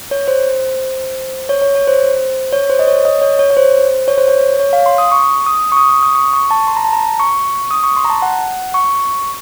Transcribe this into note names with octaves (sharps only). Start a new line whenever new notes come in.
C#5
C5
C#5
C#5
C#5
C5
C#5
C5
D#5
C#5
D#5
C#5
C#5
C#5
C5
C#5
C5
C#5
C#5
F5
C6
D#6
C#6
D#6
C#6
D#6
C#6
D#6
C#6
C#6
A5
C6
A#5
A5
A#5
C#6
D#6
C#6
C6
A#5
A5
F#5
C#6